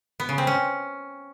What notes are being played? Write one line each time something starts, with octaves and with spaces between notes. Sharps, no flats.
B3
C#3
C4
C#4